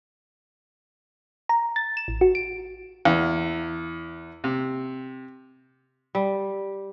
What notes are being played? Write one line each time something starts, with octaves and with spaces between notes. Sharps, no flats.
A#5
A6
E7
A1
F#4
D7
E2
C3
G3